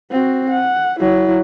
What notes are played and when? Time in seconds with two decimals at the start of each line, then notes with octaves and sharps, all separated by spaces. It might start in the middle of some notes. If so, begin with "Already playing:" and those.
0.11 C4 F#4
0.50 F#5
1.00 F#3 E4